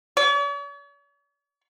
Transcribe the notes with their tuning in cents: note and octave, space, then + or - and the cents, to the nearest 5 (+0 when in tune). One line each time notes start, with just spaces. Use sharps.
C#5 +45